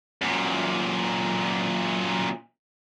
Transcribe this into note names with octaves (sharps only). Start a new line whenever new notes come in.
F#2 A#2